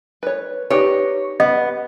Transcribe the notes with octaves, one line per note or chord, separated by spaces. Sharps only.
B4 C#5
D#4 G4 B4 C#5
B3 D#5